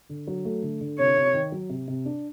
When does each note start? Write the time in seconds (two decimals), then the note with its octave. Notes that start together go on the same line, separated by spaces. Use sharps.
0.09 D3
0.27 F#3
0.45 A3
0.63 D3
0.81 D3
0.99 C3 C#5
1.17 C3
1.33 D#3
1.52 F#3
1.69 C3
1.88 C3
2.05 D4